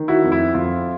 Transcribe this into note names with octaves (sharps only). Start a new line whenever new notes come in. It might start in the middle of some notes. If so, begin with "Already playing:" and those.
Already playing: D#3
E4 F#4
F2
E4
F2 F4